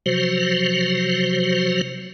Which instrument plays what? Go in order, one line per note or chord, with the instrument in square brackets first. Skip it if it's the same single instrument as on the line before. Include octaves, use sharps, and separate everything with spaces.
[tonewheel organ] C3 F3 F#3 F#4 C5